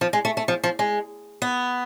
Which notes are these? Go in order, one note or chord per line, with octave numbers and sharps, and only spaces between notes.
F3
G#3
A3
A3
F3
F3
G#3
B3